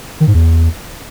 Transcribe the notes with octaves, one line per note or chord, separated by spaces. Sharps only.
D#3
G#2
E2